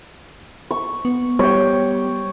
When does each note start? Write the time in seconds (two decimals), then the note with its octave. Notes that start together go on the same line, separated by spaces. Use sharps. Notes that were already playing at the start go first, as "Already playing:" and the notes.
0.71 C#6
1.05 B3
1.39 G3 C#5 G5